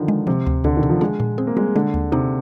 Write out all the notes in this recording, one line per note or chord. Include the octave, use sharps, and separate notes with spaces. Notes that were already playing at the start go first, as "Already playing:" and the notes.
Already playing: D3 D#3 F3
G#3
C3 F3
D2
D2 D3
D#3
C3
F3
G#3 D4
A#2
C4 G#4
A#3
G3 G#3
D3 G#3
D#2
C3 D#4